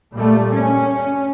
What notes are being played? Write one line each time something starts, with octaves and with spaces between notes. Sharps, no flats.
A#2 G3 A3
C#4